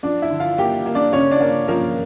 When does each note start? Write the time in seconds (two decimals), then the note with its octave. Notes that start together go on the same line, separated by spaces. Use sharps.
0.03 F3 D4 D5
0.22 E4 E5
0.31 D3
0.40 F4 F5
0.58 A#3 G4 G5
0.86 A#3
0.95 D4 D5
1.13 C#3 C#4 C#5
1.31 D4 D5
1.41 A#3
1.68 F3 A#3 A#4